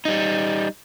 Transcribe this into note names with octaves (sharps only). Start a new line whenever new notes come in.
G3 D#4